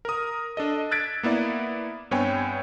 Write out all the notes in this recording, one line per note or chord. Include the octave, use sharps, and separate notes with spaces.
A#4 D#6
D4 A4 D#5
E6 F#6 G#6 A6 B6 D7
A#3 B3 E4 D5
G2 B3 C4 C#5 G5 G#5